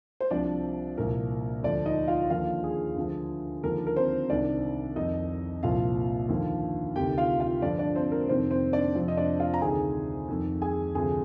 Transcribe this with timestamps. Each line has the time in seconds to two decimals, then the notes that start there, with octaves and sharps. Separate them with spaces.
0.21 C5
0.30 C2 C3 F3 D4 D5
0.97 C2 A#2 F3 A#4
1.63 D2 D3 F3 D4 D5
1.86 D#4 D#5
2.08 F4 F5
2.30 D#2 D3 F3 F4 F5
2.64 G#4
2.96 D2 D3 F3
3.63 D#2 D3 F3 A#4
3.87 A#4
3.96 C4 C5
4.29 C2 C3 D#3 D4 D5
4.96 F2 D#3 D#4 D#5
5.63 C2 A#2 F3 F4 F5
6.29 D#2 D3 F3
6.96 D2 C3 D#3 G4 G5
7.18 F4 F5
7.40 F4 F5
7.62 G2 D3 F3 D4 D5
7.79 D4 D5
7.96 C4 C5
8.12 A#4
8.29 F2 C3 D#3 C4 C5
8.51 C4 C5
8.73 D4 D5
8.95 F2 C3 F3 C4 C5
9.08 D#5
9.17 D4 D5
9.40 F4 F5
9.54 A#5
9.62 D2 C3 D#3 G#4 G#5
10.28 F2 D#3
10.62 G#4 G#5
10.95 D2 C3 F3 G#4 G#5